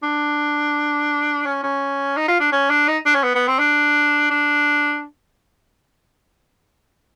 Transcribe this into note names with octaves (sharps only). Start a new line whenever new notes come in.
D4
C#4
C#4
D#4
F4
D4
C#4
D4
D#4
D4
C#4
B3
B3
C4
D4
D4